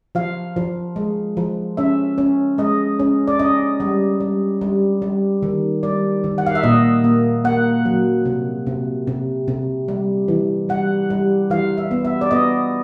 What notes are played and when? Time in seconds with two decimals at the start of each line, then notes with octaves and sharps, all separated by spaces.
0.15 F3 F5
0.56 F3
0.96 G#3
1.37 F3
1.77 C#4 E5
2.18 C#4
2.58 G#3 D#5
2.99 C#4
3.28 D5
3.39 C#4 D#5
3.80 G3
4.20 G3
4.61 G3
5.02 G3
5.42 D#3
5.83 G3 D5
6.24 D#3
6.38 F#5
6.46 F5
6.55 E5
6.63 A#2 D#5
7.04 A#3
7.44 A#3 F#5
7.85 F#3
8.26 C3
8.67 C3
9.07 C3
9.48 C3
9.88 G3
10.28 E3
10.69 G3 F#5
11.10 G3
11.50 E3 F5
11.77 E5
11.91 B3
12.05 E5
12.21 D5
12.31 B3 D#5